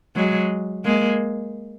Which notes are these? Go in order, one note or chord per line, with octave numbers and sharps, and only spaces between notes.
F#3 G#3
G#3 A#3